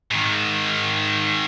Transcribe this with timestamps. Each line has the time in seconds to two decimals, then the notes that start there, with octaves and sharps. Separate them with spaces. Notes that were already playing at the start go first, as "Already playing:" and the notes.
0.11 G#2 D#3